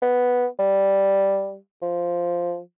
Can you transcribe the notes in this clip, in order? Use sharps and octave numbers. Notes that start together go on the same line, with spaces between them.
B3
G3
F3